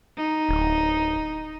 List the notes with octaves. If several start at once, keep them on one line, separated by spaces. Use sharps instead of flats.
D#4
D1